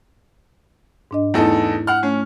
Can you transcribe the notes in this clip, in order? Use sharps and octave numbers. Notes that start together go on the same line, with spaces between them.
G#2 D4 D#5
E2 A3 D#4 E4 A4
F#5 F6
A3 C#4